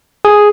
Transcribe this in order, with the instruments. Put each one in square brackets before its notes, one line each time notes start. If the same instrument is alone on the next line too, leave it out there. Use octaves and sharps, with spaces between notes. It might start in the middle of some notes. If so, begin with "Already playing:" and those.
[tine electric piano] G#4